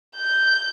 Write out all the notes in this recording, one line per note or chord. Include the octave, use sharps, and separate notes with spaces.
G6